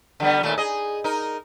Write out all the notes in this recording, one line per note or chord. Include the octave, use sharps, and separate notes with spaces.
D3 G3 B3
D#2 A#2 A3
G#4 D#5
D#4 A#4